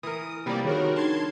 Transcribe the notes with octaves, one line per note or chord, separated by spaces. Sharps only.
E3 A#4 D#6
C3 F3 G3 A#3 B3 D5
D#3 F#4 G#4 A#4 C#5
D4 D#4 A#4 A5 C6 G#6